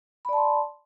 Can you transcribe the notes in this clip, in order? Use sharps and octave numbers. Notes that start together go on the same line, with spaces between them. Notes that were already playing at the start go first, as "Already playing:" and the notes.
D5 A5 B5 C6